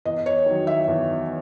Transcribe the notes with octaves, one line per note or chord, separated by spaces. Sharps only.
E2 D#5
C#5
D#3 F#3
E5
E2